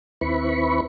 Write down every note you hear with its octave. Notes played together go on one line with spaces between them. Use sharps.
D#2 C4 E4 B4 B5 C#6